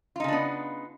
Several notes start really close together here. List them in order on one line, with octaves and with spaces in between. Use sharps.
F4 D#4 C#3 D4 B3